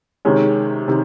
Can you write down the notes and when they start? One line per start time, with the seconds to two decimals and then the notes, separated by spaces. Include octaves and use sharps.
0.25 C3 D#3 G#3 C#4
0.88 C3 D#3